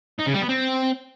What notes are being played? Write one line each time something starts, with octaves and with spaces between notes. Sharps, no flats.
D#4
C#3
G3
B3
C4